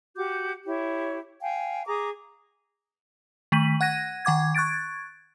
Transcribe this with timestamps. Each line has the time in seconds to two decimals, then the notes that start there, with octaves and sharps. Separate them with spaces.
0.16 F#4 G4 D6 G6
0.66 E4 G4 C#5
1.41 F5 G5 G#5
1.87 G#4 A#5 D6 D#6
3.52 D#3 A3 B6 D#7 F#7
3.81 F#5 F#6 G#6 A#6 D#7
4.25 D#3 F#5 D6 G#6
4.55 C#6 F#6 G#6 A6 D7